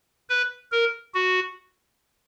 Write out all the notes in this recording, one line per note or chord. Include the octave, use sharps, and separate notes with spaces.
B4
A#4
F#4